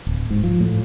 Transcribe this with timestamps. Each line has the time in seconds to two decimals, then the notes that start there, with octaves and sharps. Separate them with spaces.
0.07 D1
0.30 G#2
0.44 F3
0.60 A2